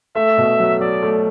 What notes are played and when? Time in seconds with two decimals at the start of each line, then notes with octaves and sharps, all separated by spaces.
0.16 A3 E5
0.38 B2
0.60 F#3
0.81 F#3 D5
1.03 A3